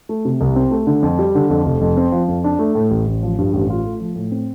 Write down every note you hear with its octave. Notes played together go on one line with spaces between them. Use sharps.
A3
C3
C2
C4
A3
D3
F2
G3
D3
F2
F1
F2
C4
F3
F2
D4
A3
A2
A1
A1
F3
G2
A1
F4
A3
F3
A2
C4